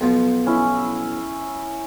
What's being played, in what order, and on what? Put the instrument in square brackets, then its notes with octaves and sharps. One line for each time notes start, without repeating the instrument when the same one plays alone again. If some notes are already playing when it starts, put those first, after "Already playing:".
[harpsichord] B1 B2 F3
[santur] C#4 E4 E5